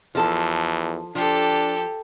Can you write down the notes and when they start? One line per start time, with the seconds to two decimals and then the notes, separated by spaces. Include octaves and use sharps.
0.15 E2 F3 A4
1.15 F3 D4 G4 A4